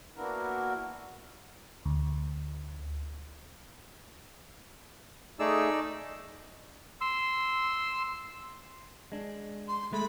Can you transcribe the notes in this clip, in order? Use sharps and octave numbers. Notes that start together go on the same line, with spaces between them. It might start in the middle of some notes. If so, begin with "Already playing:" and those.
A#3 B3 D4 E4 F#4 A#4
D2
A3 D#4 G#4 D5 E6
C6 E6
G#3 D4
C6
G#3 A3 B5